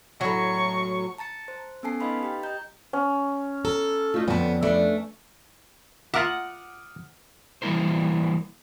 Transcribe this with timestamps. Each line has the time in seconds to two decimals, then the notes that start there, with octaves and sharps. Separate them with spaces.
0.21 A2 F#3 C#6
1.18 A5 A#5 A6 C#7
1.48 C5
1.83 B3 C#4 A4 G#5 A5 C7
2.00 D#4 B4 D#5 F5 B5 C6
2.23 G4 G5
2.43 D#5 A#5 G6
2.93 C#4
3.65 A4 A#5
4.14 A3 D#4 F4
4.28 F2 D3 B3 C4 A5
4.63 A3 D4 A4 B4
6.14 F4 A#4 E5 F#5 D6 D#6 F6
7.62 E3 G3 A#3 E4 A#4 C5